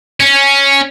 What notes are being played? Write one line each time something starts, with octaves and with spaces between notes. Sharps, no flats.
C#4